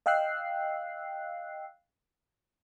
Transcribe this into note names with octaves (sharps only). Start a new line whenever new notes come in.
D#5 F5 G5 E6 F#6 C7